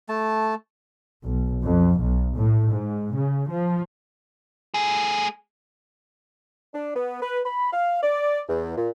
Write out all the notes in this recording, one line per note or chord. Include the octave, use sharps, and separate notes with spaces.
A3 A5
B1
F2
B1
A2
G#2
C#3
F3
A3 G#4
D4
B3
B4
B5
F5
D5
E2
A#2